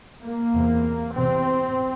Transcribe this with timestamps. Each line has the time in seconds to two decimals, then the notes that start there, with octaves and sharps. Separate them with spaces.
0.22 A#3
0.53 E2 C3
1.14 E2 C3 C4